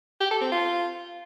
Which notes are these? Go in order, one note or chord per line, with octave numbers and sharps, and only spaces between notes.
G4
A4
C4
F4